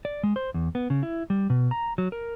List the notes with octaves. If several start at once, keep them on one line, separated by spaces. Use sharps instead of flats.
D5
G#3
C5
E2
B3
C#3
E4
G3
B2
A#5
F#3
A#4